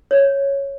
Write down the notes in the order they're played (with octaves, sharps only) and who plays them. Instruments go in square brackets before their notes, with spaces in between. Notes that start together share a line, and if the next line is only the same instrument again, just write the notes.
[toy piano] C#5